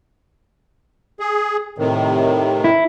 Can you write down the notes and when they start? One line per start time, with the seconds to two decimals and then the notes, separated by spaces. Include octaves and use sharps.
1.20 G#4
1.78 A2 C3 D#3
2.64 E4